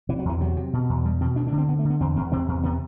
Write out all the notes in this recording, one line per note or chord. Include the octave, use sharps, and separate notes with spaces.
C3 E3
F#3
E2 E3
C3 F#3
C3
B2
E2
B2 G3
B2 C4
D2 D4
D4
D3
C4
D3 B3
A3
D3
B3
E2 C4
E2 C4
C3 C4
E2
C3 B3